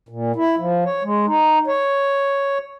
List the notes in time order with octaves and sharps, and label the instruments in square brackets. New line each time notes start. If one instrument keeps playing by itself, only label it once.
[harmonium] A#2
E4
F3
C#5
G#3
D#4
C#5